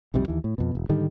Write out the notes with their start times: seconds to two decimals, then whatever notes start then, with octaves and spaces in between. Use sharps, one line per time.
0.14 B1 F2 C3 G3
0.28 D#2 E3
0.44 A2
0.58 F2 B2
0.75 E1
0.89 G#2 D3 D#3 G3